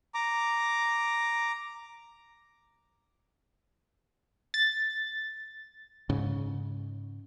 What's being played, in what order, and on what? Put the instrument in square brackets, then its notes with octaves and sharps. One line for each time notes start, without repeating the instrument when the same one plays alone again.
[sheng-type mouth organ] A#5 D6
[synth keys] A6
[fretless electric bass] G#2 C#3